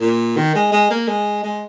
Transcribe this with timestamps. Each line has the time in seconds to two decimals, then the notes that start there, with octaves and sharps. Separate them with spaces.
0.01 A#2
0.37 D#3
0.55 G#3
0.72 G#3
0.91 A#3
1.08 G#3
1.44 G#3